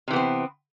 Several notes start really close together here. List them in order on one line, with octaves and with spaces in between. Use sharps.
C3 E3 B3 C4